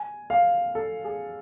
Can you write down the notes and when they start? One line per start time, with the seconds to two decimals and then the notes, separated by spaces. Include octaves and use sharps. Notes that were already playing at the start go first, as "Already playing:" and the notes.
Already playing: G#5
0.30 F5
0.75 A4
1.05 G#4